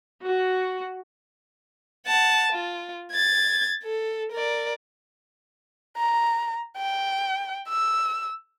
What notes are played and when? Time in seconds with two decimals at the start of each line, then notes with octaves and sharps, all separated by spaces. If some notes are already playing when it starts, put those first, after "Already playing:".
0.23 F#4
2.06 F#5 A5
2.52 F4
3.12 G#6 A6
3.84 A4
4.32 A#4 D5
5.97 A#5
6.78 G5
7.68 E6